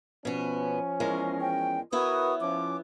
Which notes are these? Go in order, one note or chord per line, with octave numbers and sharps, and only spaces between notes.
B2 F3 B3 C#4
E2 G#3 A#4
G5
B3 E4 F#4 A#4 B4 C#5 D#6
F3 C#4 D6